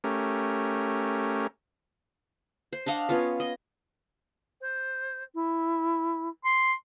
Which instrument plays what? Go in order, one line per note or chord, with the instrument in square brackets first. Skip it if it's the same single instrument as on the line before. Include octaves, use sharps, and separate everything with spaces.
[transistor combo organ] A3 C#4 G4 A#4
[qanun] C5
D4 D#5 F5 F#5
B3 C#4 F4 C#5
D#5
[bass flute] C5
E4
[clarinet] C6